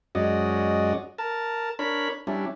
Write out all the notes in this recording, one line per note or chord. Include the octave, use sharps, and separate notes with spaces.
F#2 G#3 C#4 F#4 D5 D#5
A#4 A5
D4 A#4 C#5 B5
G3 C#4 D4 E4